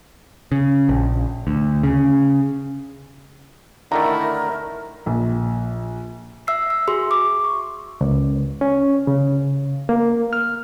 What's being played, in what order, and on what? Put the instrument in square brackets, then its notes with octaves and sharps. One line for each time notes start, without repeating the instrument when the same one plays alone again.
[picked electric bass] C#3
A#1
D2
C#3
[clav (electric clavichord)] D3 D#3 A3 [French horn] E4 [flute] A#4 [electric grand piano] A#5
[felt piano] A#1
[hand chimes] E5 E6 C7
E5 E6
F#4 G#4 C6
D6
C#6
[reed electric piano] C#2
C#4
C#3
A#3
F6